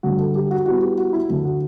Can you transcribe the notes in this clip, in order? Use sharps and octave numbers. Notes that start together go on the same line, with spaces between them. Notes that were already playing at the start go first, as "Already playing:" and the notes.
G2 D3 A3 F#4
A4
G4
F#4
A2 G3 B3 F#4
G4
F#4
E4
D2 D3 A3
F#4